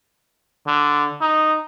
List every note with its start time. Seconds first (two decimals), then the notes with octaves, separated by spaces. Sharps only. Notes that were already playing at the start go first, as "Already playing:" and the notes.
0.67 D3
1.21 D#4